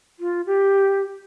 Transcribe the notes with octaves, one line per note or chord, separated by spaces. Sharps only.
F4
G4